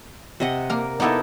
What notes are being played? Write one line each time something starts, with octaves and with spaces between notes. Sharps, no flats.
C3 D#5 F#5
A#3 A#4
A#3 B3 D#4 E4 A4